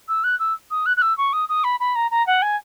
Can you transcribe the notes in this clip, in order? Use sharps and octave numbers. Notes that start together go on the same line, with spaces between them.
E6
F#6
E6
D#6
F#6
F#6
E6
C#6
D#6
D#6
B5
B5
A#5
A#5
F#5
G#5